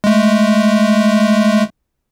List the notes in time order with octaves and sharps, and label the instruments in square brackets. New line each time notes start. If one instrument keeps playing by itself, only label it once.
[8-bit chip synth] G#3 A3